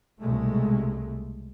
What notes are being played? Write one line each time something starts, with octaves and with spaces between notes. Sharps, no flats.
C2 B2 G#3 A3